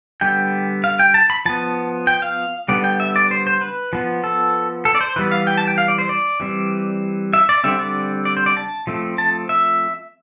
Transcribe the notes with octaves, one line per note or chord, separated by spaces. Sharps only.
D3 G3 B3 G5
F5
G5
A5
B5
F3 B3 A5
G5
F5
D3 G3 B3 D5
G5
E5
D5
C5
C5
B4
F3 B3
A4
A4
D5
C5
E3 G3 B3 B4
F5
G5
A5
G5
F5
D5
C5
D5
E3 G3 C4
E5
D5
D3 G3 C4 E5
D5
D5
C5
D5
A5
F3 A3 C4
A5
E5